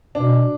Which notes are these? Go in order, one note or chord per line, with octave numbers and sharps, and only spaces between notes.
B2 D4